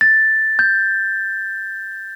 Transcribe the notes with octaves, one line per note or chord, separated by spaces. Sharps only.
A6
G6